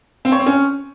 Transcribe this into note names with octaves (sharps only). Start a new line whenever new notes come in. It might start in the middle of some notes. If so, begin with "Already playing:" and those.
C4
C#5
C4
C#4